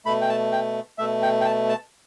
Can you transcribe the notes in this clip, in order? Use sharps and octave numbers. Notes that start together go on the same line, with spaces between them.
B2 A3 B5
G5
A5
G5
B2 A3 E5
G5
G5
A5
A5